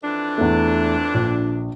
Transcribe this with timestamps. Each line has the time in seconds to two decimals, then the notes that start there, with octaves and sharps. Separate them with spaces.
0.04 F2 E3 D4
0.38 E2 A3
1.14 A#1